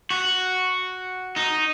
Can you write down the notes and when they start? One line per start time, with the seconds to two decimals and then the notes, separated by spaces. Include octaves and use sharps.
0.10 F#4
1.36 D#4